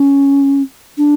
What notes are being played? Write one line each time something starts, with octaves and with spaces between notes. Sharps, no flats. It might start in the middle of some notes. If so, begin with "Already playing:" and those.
Already playing: C#4
D4